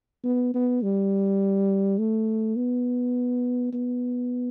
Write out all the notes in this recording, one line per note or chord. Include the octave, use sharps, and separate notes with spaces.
B3
B3
G3
A3
B3
B3